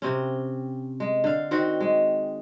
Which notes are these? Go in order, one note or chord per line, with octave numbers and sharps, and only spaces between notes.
C3 C4 C#4
G#3
D3 F5
D#3 C4 F#4
G#3